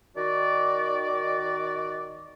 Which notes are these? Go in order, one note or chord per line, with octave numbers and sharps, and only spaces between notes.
D#3 F#4 D5